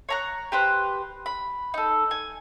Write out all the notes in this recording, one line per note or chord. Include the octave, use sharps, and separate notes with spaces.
C#5 A#5 F#6
G4 B4 C5 F#6
B5
D#4 A4
G#5